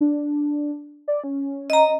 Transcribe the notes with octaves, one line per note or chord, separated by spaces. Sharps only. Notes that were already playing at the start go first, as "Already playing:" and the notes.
D4
D5
C#4
D#5 A#5